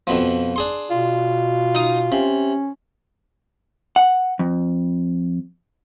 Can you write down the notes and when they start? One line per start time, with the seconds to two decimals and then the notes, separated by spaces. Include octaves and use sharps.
0.07 F2 B2 F3
0.56 D4 G#4 C6
0.91 B2 F4
1.75 D#4 F5 D#6
2.12 C3 C#4
3.96 F#5
4.39 F2